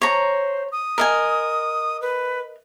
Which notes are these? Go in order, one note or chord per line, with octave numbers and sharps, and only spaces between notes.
C5 C#5 A#5
D#6
A#4 D#5 G#5
B4